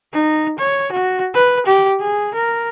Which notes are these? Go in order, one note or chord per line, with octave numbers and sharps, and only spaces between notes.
D#4
C#5
F#4
B4
G4
G#4
A#4